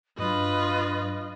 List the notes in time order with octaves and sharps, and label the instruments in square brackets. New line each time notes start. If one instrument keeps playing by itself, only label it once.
[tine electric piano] G2 F#3 [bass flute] D4 [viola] F4 B4 [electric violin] D#5